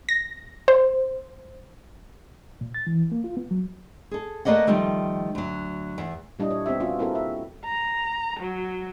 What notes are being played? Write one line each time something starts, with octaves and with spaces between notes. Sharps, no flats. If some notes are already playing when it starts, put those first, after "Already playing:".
A#6
C5
A#2
A6
E3
A#3
F4
B3
F#3
G#4 A4
A3 A#3 B4 D5 D#5 F#5
D#3 F3 G3 A3
D2 F#3
E2
A#2 G3 D4 E4 D#5
C#5
B3 C4 G4 E5
B3 C#4 F4 F#4
A#3 C4 E4 F#4 A4 A#4
E5
A#5
F#3